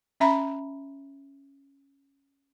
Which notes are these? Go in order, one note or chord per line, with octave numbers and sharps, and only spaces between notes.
C#4 E5 A#5 B5